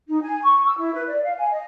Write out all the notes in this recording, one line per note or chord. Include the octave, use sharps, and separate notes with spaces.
D#4
G#5
C#6
E6
E4
B4
D5
F5
G#5
D#5